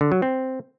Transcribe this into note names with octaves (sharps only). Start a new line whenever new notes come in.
D3
F#3
C4